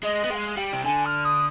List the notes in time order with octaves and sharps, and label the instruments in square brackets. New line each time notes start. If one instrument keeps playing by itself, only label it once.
[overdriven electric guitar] G#3 [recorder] D#5
[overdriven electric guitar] B3
[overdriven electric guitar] G#3 [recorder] G5
[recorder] F5
[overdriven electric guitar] G3 [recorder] G5
[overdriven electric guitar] C3
[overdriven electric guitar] D3 [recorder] G#5
[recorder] F6
D#6